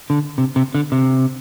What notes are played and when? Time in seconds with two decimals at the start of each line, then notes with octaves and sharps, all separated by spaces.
0.10 D3
0.38 C3
0.56 C3
0.75 D3
0.92 C3